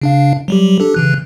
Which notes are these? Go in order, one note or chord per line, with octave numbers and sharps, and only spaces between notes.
C#3 D4 F5
F#3 G3 G4
D4 G4 A4
C#3 E3 F#6